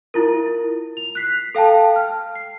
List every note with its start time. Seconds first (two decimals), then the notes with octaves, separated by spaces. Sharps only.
0.14 E4 F4 A#4
0.97 F7
1.15 F#6 B6 C7
1.55 A4 F5 G5 A5
1.96 F6
2.35 C7